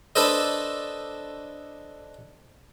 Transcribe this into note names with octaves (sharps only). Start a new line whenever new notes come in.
D4 A4 B4 C5 D#5